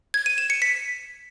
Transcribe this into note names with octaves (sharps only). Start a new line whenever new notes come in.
G#6
D#7
E7
C#7
B6